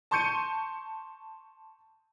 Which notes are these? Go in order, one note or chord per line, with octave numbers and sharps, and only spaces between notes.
A5 C6 C#6 G6 C#7 D#7